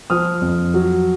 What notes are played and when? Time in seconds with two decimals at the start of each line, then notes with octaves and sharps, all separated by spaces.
0.10 F3 D#6 F6
0.41 F2
0.74 F#3